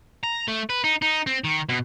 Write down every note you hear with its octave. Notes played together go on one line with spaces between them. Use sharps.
A#5
A3
B4
D#4
D#4
C4
D#3
B2